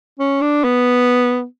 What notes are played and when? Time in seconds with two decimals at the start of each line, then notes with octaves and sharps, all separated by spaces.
0.19 C#4
0.41 D4
0.64 B3